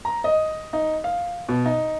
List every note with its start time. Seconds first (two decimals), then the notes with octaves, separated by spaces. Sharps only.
0.05 A#5
0.24 D#5
0.73 D#4
1.04 F5
1.49 B2
1.66 D#4